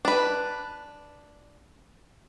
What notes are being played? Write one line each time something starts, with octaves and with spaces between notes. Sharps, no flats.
D4 B4